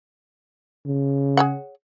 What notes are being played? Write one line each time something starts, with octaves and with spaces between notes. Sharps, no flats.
C#3
G#4 C#5 F#5